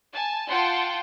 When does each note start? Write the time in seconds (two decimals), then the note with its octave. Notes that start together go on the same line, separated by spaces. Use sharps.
0.13 G#5 A5
0.48 F4 F#5 G5 A5 C6